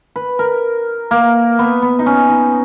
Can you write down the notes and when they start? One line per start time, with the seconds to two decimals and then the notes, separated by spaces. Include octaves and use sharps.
0.16 B4
0.39 A#4
1.11 A#3
1.59 B3
1.82 B3
1.99 D#4
2.06 C#4
2.29 D#4